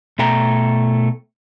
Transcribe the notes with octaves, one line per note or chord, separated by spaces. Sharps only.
B2 A3 G5 A#5